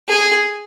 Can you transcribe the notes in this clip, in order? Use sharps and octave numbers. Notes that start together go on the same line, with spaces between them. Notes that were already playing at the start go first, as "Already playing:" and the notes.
G#4